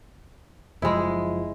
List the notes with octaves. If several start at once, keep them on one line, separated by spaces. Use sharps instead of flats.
F#1 F3 G#3 E4